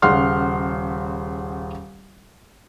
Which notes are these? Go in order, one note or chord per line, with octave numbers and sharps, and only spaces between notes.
D#1 C#3 F#5 C6 F6